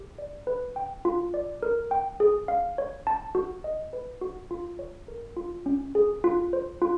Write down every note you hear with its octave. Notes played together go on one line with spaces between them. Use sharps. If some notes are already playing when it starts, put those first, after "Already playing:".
Already playing: G4
D5
B4
G5
F4
D5
A#4
G5
G#4
F5
C#5
A5
F#4
D#5
B4
F#4
F4
C#5
A#4
F4
C#4
G#4
F4
C5
F4